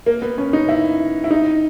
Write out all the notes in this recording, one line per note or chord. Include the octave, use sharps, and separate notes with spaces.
A#3
B3
C#4
D#4
E4
E4
D#4